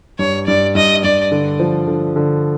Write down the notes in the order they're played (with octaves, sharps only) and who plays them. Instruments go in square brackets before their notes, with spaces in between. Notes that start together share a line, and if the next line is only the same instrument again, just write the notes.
[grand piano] G2 [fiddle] C#5
[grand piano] G2 [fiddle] D5
[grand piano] G2 [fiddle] D#5
[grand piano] G2 [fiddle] D5
[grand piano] D3
F3
D3
D3